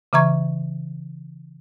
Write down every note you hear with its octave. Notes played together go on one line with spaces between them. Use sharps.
C#3 E3 E5 A#5 C#6 G#6